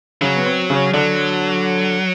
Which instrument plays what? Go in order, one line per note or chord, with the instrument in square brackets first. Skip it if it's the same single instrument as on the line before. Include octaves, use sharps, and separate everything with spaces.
[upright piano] C#3 C#4 [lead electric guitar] F#3
[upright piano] B3
C4
C#3 C#4
[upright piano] D3 D4 [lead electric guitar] F#3